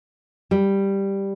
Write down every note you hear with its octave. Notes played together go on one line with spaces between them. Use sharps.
G3